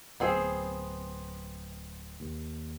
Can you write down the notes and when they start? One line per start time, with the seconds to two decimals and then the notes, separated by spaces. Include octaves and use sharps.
0.20 D1 B3 C4 G#4
2.20 D#2